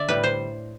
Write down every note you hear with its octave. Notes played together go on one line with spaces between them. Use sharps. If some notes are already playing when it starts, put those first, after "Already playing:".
Already playing: D3 D5 E5
A2 G3 B4
C5